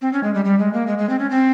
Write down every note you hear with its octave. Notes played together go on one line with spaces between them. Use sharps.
C4
C#4
G#3
G3
G3
G#3
A#3
G#3
G#3
C4
C#4
C4